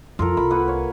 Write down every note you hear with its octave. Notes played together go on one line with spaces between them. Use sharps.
F2 F4 A4 A#4
C2 B5
A#3 B4 F#5
C#5